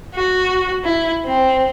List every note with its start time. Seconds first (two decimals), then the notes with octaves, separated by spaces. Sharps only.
0.14 F#4
0.84 E4
1.25 C4